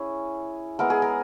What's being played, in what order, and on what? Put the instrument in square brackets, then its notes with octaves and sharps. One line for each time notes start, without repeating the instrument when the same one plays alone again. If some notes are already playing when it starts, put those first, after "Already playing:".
Already playing: [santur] C#4 E4 G#4
G#3 B3 E4 A#4
G#4
A#4